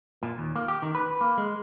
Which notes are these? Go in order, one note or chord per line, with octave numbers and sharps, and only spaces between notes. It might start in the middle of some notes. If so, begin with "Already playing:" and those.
A#2
D#2
A#3
G4
D#3
B4
A#3
G#3